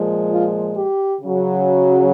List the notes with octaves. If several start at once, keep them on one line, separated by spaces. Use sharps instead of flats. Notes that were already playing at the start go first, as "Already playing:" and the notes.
Already playing: A#2 F3 G#3
F4
G4
C#3 F#3